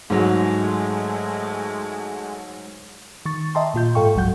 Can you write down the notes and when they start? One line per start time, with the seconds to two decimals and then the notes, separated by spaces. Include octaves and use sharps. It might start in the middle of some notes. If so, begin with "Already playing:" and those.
0.10 G#2 F#3 G#3 A3
3.26 D#3 C#6 A6
3.55 D#5 E5 G5 A5 A#5 C6
3.74 A#2 F4 G6
3.95 G#2 A4 F5 G5 C#6
4.16 G1 C#2 G#2 F#3 F#5 G6